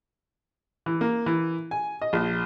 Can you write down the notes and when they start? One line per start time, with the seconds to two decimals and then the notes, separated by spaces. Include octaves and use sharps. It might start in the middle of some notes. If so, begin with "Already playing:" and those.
0.86 E3
1.01 A#3
1.26 E3
1.71 G#5
2.02 D#5
2.13 A#1